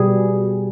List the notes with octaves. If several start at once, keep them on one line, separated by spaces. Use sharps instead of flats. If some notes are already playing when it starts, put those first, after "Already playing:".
Already playing: B2 G3 G#4